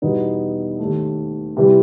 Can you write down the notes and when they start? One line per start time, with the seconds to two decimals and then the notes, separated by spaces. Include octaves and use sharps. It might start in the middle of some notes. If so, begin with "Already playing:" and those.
0.02 E2 B2 G3 B3 D#4
0.79 D#2 D#3 A3
1.57 C3 E3 G3